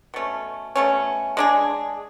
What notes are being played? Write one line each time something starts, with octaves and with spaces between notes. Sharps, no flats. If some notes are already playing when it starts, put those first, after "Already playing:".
B2 A3 C#4
B2 A3 C#4
G#3 D4 G#4